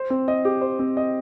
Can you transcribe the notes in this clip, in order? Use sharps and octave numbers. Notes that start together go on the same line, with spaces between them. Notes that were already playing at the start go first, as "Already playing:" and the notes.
Already playing: C5
C4
D#5
G4
C5
C4
D#5